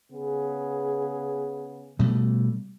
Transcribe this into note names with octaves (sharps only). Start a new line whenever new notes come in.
C#3 B3 G#4
B2 G3 A3